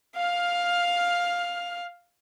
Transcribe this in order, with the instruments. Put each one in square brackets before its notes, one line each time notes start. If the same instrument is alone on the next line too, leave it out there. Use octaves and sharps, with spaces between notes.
[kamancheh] F5 F6